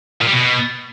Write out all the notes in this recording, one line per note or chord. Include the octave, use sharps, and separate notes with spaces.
A#2
G3
B2